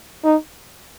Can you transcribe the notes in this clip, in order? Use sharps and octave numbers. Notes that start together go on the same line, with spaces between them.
D#4